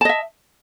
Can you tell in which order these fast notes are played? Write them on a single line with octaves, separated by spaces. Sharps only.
A5 D#5 E5